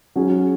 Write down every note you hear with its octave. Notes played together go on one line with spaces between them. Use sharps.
F#3 C#4 G#4